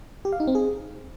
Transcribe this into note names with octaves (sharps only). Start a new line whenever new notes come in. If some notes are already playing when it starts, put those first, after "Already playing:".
G4
F5
D#4
C4
G#4